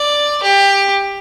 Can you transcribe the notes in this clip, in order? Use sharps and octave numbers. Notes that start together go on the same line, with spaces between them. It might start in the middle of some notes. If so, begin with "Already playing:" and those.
Already playing: D5
G4